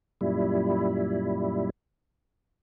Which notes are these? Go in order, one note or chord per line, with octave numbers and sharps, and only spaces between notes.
F#2 A#2 G3 E4